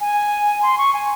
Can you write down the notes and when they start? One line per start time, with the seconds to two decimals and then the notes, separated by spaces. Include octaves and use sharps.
0.01 G#5
0.62 C6
0.78 C#6
0.93 G#5